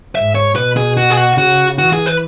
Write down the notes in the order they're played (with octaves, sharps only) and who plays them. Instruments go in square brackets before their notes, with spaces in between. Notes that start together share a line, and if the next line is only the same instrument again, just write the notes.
[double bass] G#2 [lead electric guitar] E5
[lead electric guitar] C#5
[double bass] B2 [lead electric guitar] B4
[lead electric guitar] G#4
F#4
G#4
F#4
[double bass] C#3 [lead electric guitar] F#4
[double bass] E3 [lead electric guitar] F#4
[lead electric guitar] G#4
B4